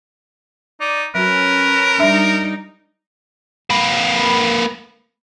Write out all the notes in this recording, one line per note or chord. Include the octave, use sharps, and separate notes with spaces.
D#4 D5
F#3 C#4 F#4 A#4 B4
G3 D4 D#4 E5
A#3 B4